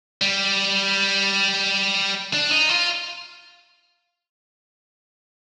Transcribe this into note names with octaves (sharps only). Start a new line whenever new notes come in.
G3
D4
D#4
F4